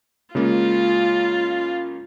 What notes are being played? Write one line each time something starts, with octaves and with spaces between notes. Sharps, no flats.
C#3 G#3 A#3 F4